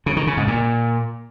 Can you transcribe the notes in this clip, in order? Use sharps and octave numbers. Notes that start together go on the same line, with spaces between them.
C#3
D#3
C#3
G#2
A#2